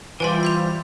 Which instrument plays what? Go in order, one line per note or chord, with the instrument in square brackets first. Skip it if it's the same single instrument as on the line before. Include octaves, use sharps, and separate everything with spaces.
[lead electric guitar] E3 G3 [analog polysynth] F4 C5 E5 [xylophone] B4 G#5 C6
[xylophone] C6 G6 F7